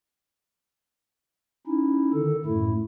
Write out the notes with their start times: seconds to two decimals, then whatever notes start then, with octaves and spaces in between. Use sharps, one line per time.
1.67 C#4 D#4 E4
2.13 D3 D#3 A4
2.45 F#2 A2 A3 E4